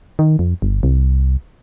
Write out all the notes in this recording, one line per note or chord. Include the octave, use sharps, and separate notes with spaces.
D#3
F2
G1
C2